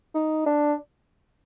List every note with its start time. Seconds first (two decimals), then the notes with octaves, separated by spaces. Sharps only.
0.15 D#4
0.46 D4